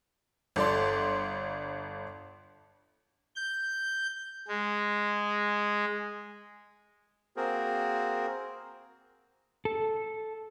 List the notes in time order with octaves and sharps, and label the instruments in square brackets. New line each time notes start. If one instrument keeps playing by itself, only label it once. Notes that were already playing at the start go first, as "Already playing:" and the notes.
[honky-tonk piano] G1 A4 D5 C6
[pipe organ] G6
G#3
[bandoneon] A#3 C4 F#4 G#4 A#4 C5
[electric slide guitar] A4